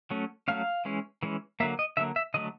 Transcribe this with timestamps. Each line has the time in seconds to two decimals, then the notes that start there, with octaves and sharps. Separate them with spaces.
0.10 F#3 A3 C#4
0.48 F#3 A3 C#4 F5
0.85 E3 G#3 C#4
1.23 E3 G#3 C#4
1.60 D3 F#3 A#3 E5
1.79 D#5
1.97 D3 F#3 A#3 E5
2.16 E5
2.34 D3 F#3 A3 D#5